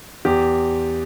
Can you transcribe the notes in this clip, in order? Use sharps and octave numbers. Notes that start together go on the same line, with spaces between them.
E2 G4